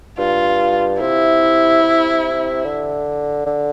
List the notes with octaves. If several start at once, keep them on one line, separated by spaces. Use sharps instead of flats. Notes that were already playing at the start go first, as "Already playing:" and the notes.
G2 F4
C3 E4
C3
D3
D3